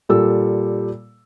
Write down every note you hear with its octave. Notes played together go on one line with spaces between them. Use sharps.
A#2 G3 A4 E6